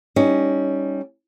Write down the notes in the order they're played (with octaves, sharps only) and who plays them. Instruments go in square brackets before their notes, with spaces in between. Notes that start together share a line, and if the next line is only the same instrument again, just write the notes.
[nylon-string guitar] G3 C#4 D#4